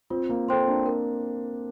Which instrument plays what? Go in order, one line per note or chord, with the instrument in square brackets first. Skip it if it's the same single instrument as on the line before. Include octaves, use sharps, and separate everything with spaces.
[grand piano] C4 [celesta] F4
[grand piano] A#3
[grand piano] C4 [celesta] A4 C5 G5 C6
[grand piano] A#3 D4
[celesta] A#4